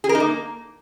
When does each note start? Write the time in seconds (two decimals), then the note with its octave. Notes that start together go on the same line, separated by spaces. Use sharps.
0.04 G#4
0.09 A#4
0.15 D#4
0.20 A#3